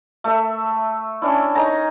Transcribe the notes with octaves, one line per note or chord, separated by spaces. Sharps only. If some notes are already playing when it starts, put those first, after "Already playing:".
A3 E5
C#4 D4 E4
D#4 C#5 G#5 A#5